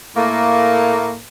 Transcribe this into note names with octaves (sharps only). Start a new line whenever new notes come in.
A2 A3 A#3